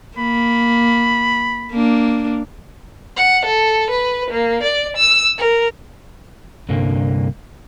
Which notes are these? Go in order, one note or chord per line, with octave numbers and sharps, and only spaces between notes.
A#3 B5
A#3 D4
F#5
A4
B4
A#3
D5
E6
A#4
C2 G2 D3 A#3